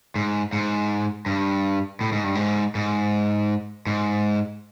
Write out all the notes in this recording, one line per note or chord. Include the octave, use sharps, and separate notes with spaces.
G#2
G#2
G2
A2
G#2
G2
G#2
G#2
G#2